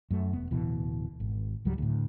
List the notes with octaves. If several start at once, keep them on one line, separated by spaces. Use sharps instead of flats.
F#2 A3
E1 B3
D1 B2 E3
G#1
C#2 G#2 F#3 G3
D2 A2